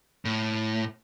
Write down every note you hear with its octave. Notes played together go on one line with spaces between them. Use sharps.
A2